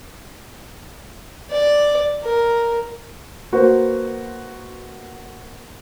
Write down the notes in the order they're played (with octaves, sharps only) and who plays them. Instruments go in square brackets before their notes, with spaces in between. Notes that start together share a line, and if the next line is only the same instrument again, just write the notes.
[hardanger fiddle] D5
A#4
[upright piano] A#3 F#4 B4 C5